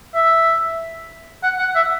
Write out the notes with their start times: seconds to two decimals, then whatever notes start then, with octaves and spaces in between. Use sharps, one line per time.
0.15 E5
1.43 F#5
1.59 F#5
1.75 E5